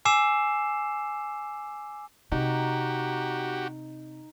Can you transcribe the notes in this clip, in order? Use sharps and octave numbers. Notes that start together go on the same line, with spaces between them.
G#5 D6 E6 C7 E7
C3 D#4 F#4 G4